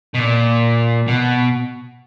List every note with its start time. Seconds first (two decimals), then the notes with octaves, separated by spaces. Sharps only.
0.14 B2
0.19 A#2
1.08 B2